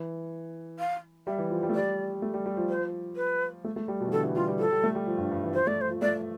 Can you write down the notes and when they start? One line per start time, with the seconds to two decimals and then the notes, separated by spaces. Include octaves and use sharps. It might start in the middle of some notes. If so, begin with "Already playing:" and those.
Already playing: E3
0.79 F5
1.27 G3 E5
1.38 E3
1.50 F3
1.63 G3
1.69 A3
1.75 G3 D5
2.22 A3
2.34 G3
2.46 G3
2.57 F3
2.70 C5
3.16 B4
3.64 A3
3.76 A3
3.88 G3
4.00 B2
4.07 E3
4.11 D3 A4
4.23 E3
4.35 G3 F4
4.48 G3
4.59 F3 A4
4.72 G3
4.84 A3
4.95 G3
5.07 F3
5.18 G2
5.31 G2
5.43 E3
5.54 F3 C5
5.67 A3 D5
5.81 C5
5.90 F3
6.02 A3 D5